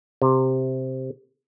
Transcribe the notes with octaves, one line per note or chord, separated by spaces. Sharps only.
C3